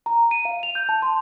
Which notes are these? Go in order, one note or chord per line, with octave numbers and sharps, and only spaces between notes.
A#5
D#7
F5
F7
G6
A5
C6